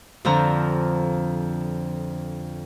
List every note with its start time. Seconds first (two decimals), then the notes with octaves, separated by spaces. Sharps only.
0.25 F2 D3 F3 D4 A#5